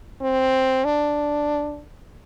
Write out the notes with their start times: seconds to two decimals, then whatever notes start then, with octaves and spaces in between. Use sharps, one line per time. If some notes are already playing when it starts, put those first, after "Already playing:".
0.21 C4
0.85 D4